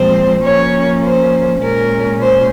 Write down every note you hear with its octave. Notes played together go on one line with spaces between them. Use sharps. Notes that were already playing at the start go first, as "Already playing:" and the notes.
Already playing: A#2 F3 G#3 C4 C5
F3 A#3 C#4 C#5
C5
A#2 G#3 C#4 A#4
C5